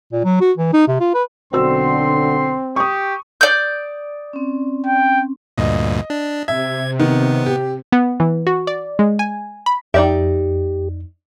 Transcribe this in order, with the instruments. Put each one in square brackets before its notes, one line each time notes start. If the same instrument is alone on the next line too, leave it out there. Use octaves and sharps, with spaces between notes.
[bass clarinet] A#2
F#3
F#4
E3
D#4
C3
F4
B4
[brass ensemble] B1 D3 [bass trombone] C4 [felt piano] F#4 C5 E6 [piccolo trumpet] C6
[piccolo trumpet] G4 [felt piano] C#6 D#6
[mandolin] D5 G6 [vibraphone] D#6
[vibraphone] C4 C#4
[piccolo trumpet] G5
[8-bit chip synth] D2 G2 A#2 [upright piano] D#5
[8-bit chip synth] D4
[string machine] C3 [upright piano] E5 [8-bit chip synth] G#6
[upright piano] D#3 [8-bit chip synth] B3
[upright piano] G4
[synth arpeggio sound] B3
E3
F#4
D5
G#3
G#5
B5
[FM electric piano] F2 [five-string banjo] D#4 D5 E5 [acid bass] G4